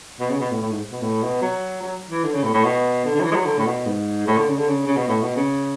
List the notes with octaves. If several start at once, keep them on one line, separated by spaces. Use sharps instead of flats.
B2
C#3
B2
A2
A2
G#2
B2
A2
B2
F#3
F#3
E3
D3
C#3
A2
A2
B2
D3
D3
F#3
E3
G#3
F#3
D3
A2
B2
G#2
A2
D3
C#3
D3
C#3
C#3
B2
A2
B2
C#3